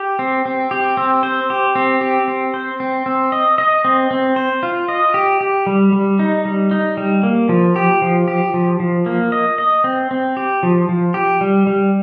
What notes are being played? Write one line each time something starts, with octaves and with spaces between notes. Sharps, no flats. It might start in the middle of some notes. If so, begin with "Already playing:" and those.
Already playing: G4
C4
C4
G4
C4
C5
G4
C4
G4
C4
C5
C4
C4
D#5
D#5
C4
C4
C5
F4
D#5
G4
G4
G3
G3
D#4
G3
D#4
G3
A#3
F3
G4
F3
G4
F3
F3
A#3
D#5
D#5
C4
C4
G4
F3
F3
G4
G3
G3